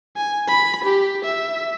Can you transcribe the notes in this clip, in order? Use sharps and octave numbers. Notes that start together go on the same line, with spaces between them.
G#5
B5
G4
E5